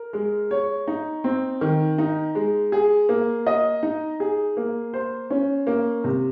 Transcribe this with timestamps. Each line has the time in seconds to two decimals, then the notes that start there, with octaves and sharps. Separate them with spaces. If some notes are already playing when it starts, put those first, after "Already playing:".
Already playing: A#4
0.13 G#3
0.51 C#5
0.88 D#4
1.24 C4
1.61 D#3
1.98 D#4
2.35 G#3
2.72 G#4
3.09 A#3
3.47 D#5
3.83 D#4
4.20 G#4
4.57 A#3
4.94 C5
5.30 C#4
5.67 A#3
6.04 C3